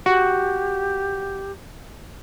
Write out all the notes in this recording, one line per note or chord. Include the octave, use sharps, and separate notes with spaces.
F#4 G4